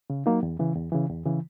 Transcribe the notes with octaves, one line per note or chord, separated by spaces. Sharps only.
C#3
F#3 A#3 D#4
E2
C#3 E3
E2
C#3 E3
E2
C#3 E3